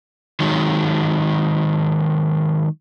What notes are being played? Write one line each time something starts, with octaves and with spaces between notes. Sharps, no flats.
D#3 F#3 G#3